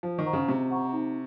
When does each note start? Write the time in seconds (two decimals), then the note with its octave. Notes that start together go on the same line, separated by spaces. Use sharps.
0.03 F3 F4
0.19 D#3
0.25 C5 F#5 A#5 C#6
0.33 C#3
0.48 C3 F4
0.70 C5 F#5 A#5 C#6
0.93 D#4